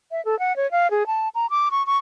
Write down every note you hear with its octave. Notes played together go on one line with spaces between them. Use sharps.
E5
A4
F#5
C#5
F5
G#4
A5
A#5
D6
C#6
C#6